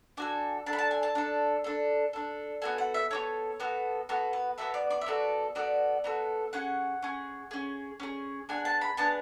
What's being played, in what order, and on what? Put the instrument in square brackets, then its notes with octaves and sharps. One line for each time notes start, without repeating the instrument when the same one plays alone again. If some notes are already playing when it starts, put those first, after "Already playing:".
[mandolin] D4 F#4 A4 G#5
D4 A4 A5
B5
A5
G#5
A5
D4 A4
D4 A4
D4 A4
B3 F#4 A4 G#5
F#5
E5
B3 F#4 A4 C#5
B3 F#4 A4
B3 F#4 A4
B4
B3 F#4 A4 E5
D5
D5
E5
B3 F#4 A4 D5
B3 F#4 A4 D5
B3 F#4 A4
C#4 G#4 F#5
C#4 G#4
C#4 G#4
C#4 G#4
B3 D4 G#4 G#5
A5
B5
B3 D4 G#4 A5